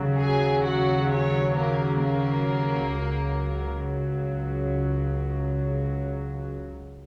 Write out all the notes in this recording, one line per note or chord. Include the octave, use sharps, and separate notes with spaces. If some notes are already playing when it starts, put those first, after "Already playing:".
Already playing: D#2 C#3 F#3
G#4 G#5
F#4 F#5
C#4 C#5
A#3 A#4
A#3 A#4
C#2 C#3 F#3